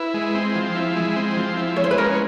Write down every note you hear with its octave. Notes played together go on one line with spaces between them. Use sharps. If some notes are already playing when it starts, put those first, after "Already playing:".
Already playing: E4 B4
G#3
C4
F3
E4
G#3
C4
F3
E4
G#3 C#5
C5
B4
C#4 A#4